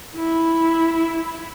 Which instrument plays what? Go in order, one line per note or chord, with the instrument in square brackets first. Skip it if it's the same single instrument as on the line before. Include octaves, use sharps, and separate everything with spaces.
[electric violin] E4